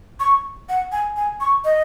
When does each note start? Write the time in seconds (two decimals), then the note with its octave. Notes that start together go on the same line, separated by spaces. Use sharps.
0.20 C#6
0.69 F#5
0.92 G#5
1.17 G#5
1.40 C#6
1.65 D#5